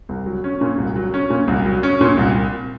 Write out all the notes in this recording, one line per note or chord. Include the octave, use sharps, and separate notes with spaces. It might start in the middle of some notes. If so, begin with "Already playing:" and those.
C2
F#3
C#4
A#2
C2
F#3
C#4
A#2
C2
F#3
C#4
A#2
C2